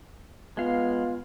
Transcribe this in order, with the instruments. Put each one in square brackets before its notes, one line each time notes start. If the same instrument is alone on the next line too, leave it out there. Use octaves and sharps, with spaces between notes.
[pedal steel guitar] G#3 F5 [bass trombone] B3 [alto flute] F4